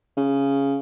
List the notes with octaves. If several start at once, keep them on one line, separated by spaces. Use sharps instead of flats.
C#3